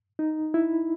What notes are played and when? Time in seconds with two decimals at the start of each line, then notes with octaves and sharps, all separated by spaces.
0.19 D#4
0.54 E4